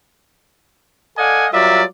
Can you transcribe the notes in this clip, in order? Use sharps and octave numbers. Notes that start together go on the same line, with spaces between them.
A4 D5 D#5 F5 F#5 G#5
F#3 G3 F4 A#4 D5 E5